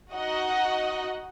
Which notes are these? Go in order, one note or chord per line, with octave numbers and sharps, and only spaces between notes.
D#4 F#4 D#5 F#5